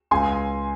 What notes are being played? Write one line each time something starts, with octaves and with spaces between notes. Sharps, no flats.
C#2 G#5 C6